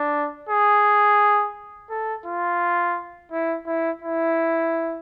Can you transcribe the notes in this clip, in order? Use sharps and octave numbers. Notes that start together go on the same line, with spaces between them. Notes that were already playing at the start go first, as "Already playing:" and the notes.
Already playing: D4
G#4
A4
F4
E4
E4
E4